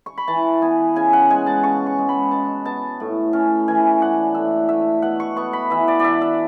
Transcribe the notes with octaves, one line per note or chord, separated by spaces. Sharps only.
C#6
B5
E3 A5
B3 G#5
C#3 G#5
F#5
G#3 G#5
A5
C#3 C#6
C#6
G#3
B5
B2 A5
B3 A5
A2
C#4
E3 G#5
D4 F#5
A2 E5
A3 E5
B2 F#5
C#6
B3 C#6
B5
E3 E5
D5
D4 D5 E5
E5